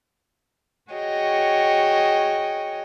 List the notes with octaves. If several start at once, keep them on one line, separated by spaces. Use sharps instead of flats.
F#4 G#4 C#5 D#5 G5